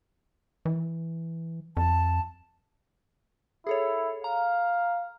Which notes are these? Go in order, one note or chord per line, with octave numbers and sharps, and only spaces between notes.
E3
F2 A5
E4 G#4 A4 C#5
F5 A#5